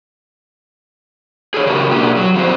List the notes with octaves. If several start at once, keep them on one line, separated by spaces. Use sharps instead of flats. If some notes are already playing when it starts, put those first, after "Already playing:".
G#4 A4 C#5
C#3 F#4 G4 A#4
B2 A#3 D4 G4 G#4
F#3
F3 C4 F#4 C5